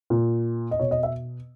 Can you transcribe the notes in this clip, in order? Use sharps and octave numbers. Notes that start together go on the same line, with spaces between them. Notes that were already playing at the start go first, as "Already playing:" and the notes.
A#2
D#5
B2 C#5
D#5
E5